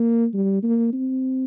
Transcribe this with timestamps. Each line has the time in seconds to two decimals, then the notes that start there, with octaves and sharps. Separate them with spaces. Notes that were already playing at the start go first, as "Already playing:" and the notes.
Already playing: A#3
0.34 G3
0.63 A#3
0.93 C4